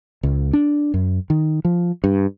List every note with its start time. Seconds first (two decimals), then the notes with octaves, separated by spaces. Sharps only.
0.23 C#2
0.53 D4
0.94 F#2
1.30 D#3
1.65 F3
2.04 G2